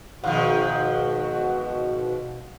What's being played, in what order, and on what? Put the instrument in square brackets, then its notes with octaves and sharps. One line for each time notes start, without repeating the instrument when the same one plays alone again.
[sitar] G#2 D#3 F3 [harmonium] B2 [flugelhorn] F#4 [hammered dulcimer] F5 F#5